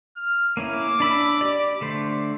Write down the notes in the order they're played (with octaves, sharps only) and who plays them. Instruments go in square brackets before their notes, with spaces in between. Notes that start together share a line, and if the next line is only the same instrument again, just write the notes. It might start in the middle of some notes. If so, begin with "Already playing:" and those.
[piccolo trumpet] F6
[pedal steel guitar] A#3 C#4 E4 [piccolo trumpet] D6
[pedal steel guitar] D4 B5 E6
G4 D5
D3 A3 C5